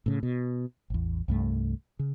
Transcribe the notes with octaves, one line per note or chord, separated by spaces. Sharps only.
A2 C#3
B2
A1 E2
C2 G2 A3
C#3